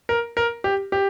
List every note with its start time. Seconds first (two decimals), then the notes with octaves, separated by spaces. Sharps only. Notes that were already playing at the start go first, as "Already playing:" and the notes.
0.09 A#4
0.37 A#4
0.64 G4
0.92 G4